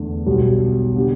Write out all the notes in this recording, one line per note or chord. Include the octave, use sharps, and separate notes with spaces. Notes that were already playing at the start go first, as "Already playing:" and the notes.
Already playing: E2 D3 A3
B1 B2 G3
D3 B3 G4